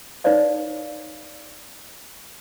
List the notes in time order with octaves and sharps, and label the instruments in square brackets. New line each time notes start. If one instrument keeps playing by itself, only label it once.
[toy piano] D#4 B4 C#5 D5 F5